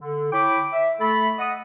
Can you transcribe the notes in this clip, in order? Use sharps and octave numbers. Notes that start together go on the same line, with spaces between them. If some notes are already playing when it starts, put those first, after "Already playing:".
D3
E4 C#5 G5 B5 D6
E5
A3 A4 B5
D#5 F#5 D#6